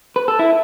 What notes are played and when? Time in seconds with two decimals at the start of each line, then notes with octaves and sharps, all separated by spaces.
0.16 B4
0.28 A4
0.39 E4